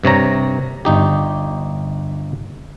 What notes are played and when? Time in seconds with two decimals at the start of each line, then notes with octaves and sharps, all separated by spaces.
0.04 G2 C3 C#5 A#5
0.85 G1 D#4 G4